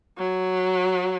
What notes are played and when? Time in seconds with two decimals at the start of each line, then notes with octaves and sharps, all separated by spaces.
0.18 F#3